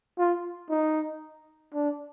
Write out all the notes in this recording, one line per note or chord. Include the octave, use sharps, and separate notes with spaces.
F4
D#4
D4